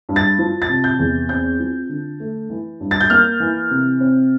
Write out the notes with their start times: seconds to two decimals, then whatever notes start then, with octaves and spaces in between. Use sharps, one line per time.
0.09 G2
0.16 A6
0.39 F3
0.62 A6
0.69 C3
0.84 G6
0.99 E2
1.29 C4 G6
1.60 F3
1.89 D3
2.20 A3
2.50 E3
2.80 G2
2.91 A6
3.01 G6
3.10 A#3 F6
3.40 E3
3.71 C3
4.00 C4